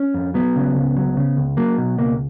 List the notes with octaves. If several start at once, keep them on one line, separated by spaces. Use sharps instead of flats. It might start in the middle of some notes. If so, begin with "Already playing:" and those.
Already playing: C#4
F2
F#3 B3
C#3
C#2
F#3
C#3
C#2
F#3 A#3
B2
C#2 A#3